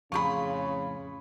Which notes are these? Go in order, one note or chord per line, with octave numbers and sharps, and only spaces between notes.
F2 A2 C#3 F4 G4 G#4 B5 C#6